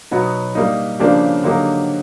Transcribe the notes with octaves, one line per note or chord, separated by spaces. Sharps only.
B2 F#3 B3 D#4
G3 A#3 D#4
C#3 F3 A#3 D4 G4
D3 F#3 A#3 D#4 G4